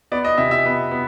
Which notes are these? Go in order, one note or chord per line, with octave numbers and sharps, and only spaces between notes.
B3 D5
D#5
C3 E5
E5
B3
B3